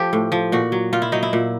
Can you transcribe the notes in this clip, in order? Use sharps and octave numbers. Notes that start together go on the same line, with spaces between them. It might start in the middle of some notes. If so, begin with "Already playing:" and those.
Already playing: F3 G4 A4
A2
F3
A#2 F#4
F#3
A#2 F4
E4
F#3 D#4
E4
A#2